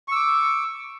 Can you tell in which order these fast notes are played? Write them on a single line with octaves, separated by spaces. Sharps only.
C#6 E6 D6